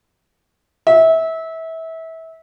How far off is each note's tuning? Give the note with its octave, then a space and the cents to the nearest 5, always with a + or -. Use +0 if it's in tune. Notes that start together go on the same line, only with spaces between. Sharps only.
E5 -25